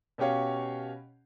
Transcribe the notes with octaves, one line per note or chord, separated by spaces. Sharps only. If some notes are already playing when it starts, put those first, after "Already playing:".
B2 C#4 G4 C#5 F5